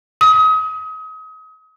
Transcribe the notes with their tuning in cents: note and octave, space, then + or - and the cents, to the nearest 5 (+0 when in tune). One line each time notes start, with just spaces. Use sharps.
D#6 +30